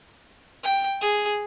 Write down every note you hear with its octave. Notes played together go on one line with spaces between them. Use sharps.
G5
G#4